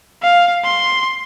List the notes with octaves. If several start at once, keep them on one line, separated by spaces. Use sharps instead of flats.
F5
C6